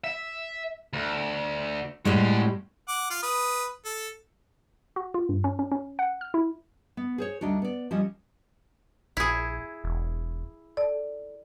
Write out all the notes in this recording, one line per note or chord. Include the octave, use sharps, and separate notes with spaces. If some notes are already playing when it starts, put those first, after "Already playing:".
E5
D2
A2 G3 G#3 C#4 F#4
F#5 D6
F4 F5
B4 D#6
A4
F#4
F4
G2
C#4
C#4
C#4
F#5
F6
E4
B3
G#4 C5 C#5
D2 G3 D4 D#4 F#4
B3 D5
F3 G3 C#4 D#5
A#1 E4 G#4
E1
A4 D5